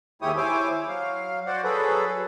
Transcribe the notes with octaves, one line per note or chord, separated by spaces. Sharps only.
D#2 G#3 E4 G4 C#5 D#6
E4 C5 C#5 G#5 D6
F#3 F5
F#4 C5 D5 F#5
F#3 G#4 A4 B4